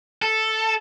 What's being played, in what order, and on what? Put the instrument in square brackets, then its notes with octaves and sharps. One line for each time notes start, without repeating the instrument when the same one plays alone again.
[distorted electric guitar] A4